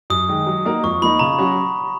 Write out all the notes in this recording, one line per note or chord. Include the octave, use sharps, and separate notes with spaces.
F#2 D#6
D#3 G#3
F#3
A#3 D#4 F#4 A#4
F2 C#6
F3 A#3 D#4 B5
C#3 A#5
F#3 C#4 F#4